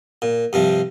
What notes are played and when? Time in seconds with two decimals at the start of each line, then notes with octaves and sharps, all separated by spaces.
0.22 A#2
0.53 G2 C3 F3